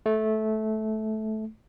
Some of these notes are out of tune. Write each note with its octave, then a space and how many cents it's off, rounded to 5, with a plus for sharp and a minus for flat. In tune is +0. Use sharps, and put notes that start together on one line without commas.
A3 -15